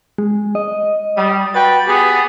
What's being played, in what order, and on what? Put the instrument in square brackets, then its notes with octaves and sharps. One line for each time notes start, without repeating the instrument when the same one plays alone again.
[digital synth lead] G#3
D#5
[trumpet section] G3 [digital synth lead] D#6
[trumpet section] F#4 B4 G5 [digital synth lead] A6
[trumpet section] B3 G4 G#4